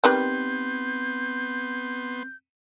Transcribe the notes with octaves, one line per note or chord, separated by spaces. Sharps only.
D#3 G3 B3 C4 B4 C6 G6